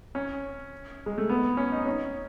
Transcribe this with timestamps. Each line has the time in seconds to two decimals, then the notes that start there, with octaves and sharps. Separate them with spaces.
0.15 C#4
1.06 G#3
1.18 A3
1.29 B3
1.57 C#4
1.72 D#4
1.86 C#4